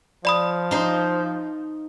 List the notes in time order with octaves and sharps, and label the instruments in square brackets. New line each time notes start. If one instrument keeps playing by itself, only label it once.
[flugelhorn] F3 [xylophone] D5 B5 D#6
[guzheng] D#4 C5